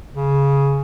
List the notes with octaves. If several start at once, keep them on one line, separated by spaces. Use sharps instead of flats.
C#3